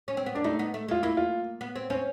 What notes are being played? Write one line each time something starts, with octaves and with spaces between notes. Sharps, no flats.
C#4
C4
B3
A#3 D4
A3 D#4
B3
A3
G#3 F4
A#3 E4
F4
B3
C4
C4 C#4